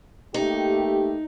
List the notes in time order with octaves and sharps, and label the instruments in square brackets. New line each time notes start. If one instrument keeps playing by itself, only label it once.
[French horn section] A3 A#3 G4 [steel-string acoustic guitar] D#4